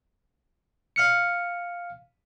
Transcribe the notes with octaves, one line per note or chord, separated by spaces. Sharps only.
F5 F6 C#7